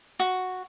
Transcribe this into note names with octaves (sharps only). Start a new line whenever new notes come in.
F#4